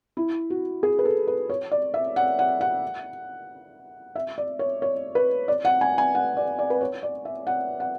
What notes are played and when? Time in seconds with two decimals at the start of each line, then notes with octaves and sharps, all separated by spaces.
0.17 E4
0.50 F#4
0.83 G#4
0.99 B4
1.05 A4
1.27 B4
1.49 C#5
1.71 D5
1.94 E5
2.16 F#5
2.39 F#5
2.61 F#5
4.16 E5
4.38 D5
4.59 C#5
4.82 C#5
5.15 B4
5.48 D5
5.65 F#5
5.81 G#5
5.98 G#5
6.15 F#5
6.37 D5
6.59 D5
6.70 B4
6.81 C#5
7.03 D5
7.25 E5
7.47 F#5
7.80 F#5